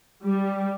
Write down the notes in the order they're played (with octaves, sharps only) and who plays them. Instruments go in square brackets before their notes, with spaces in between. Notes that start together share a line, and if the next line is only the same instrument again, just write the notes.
[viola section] G3